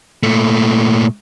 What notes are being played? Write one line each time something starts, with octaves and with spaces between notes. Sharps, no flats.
A#2 A3